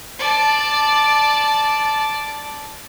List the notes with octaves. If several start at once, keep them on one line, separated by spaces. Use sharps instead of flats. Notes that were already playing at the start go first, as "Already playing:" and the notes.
D5 A5